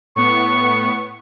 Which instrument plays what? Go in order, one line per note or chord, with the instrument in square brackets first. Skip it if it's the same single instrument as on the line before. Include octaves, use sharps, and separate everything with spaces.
[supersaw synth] A2 B3 [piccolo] C#6